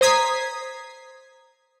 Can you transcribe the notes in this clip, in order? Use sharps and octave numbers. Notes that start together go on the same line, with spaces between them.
C5 A#5 D#6 G#6 B6 C7